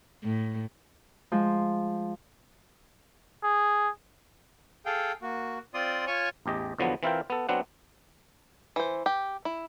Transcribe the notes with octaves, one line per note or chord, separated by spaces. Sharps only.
A2
F3 G#3
G#4
G#4 A4 F5 G5
A#3 F#4
C4 F4 D5 C6 D#6
F4 C#5 G#5 C#6
A1 E2 G4 D#5
E2 D3 F3 F#3 B3
E3 C4 E4 F4 A#4 G5
B3 A4
F#3 B3 C4 D4 F#5
E3 C5
G4
E4